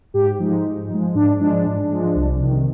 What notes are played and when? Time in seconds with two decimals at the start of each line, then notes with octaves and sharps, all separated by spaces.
0.14 G#2 G4
0.39 F3 G#3 D#4
0.64 G#2
0.89 F3 G#3
1.15 G#2 D4
1.40 F3 G#3 D4
1.65 G#2
1.90 F3 G#3
2.15 C2
2.40 C3 D#3